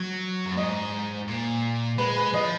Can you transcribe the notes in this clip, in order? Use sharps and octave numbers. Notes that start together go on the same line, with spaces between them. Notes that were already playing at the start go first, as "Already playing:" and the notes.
Already playing: F#3 C#5
F#2
G#2 D#5
A#2
G#3 B4
B4
F3 D#5